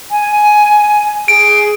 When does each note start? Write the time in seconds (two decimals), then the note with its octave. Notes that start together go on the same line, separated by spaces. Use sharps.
0.11 G#5
1.28 G#4 D7